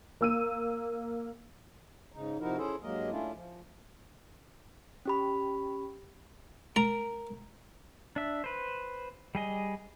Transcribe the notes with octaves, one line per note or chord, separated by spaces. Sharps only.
A#3 E6 D#7
G#2 C#3 D#4
C3 F3 D#4 E4 F#4 A#4
C#4 E4 G#4 A4 C5
G2 F#3 G#3 A#3 A#4 D#5
A3 C#4 D4 E4 F4
F3
C#4 G4 B5
A#4 A#5
D4 E5
B4 C5
G3 G#4 D#5